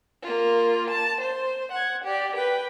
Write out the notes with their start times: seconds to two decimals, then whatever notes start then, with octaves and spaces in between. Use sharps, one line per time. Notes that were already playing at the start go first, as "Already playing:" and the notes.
0.22 A#3 F4
0.90 A5
1.21 C5
1.72 F#5 G#6
2.05 G4 D5
2.36 B4 G5